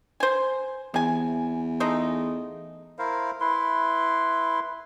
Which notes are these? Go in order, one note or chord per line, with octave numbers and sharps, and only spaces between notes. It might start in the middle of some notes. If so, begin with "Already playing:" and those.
C5 G#5
E2 C3 G#5
G#3 A3 D#4
E4 A#4 C5 F5
E4 B4 C6